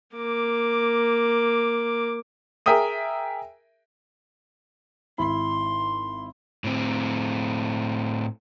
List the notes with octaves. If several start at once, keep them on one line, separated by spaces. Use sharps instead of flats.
A#3 D6
G#4 A#4 E5 G5 D#6 D#7
G#1 E4 B5 C6
A2 C4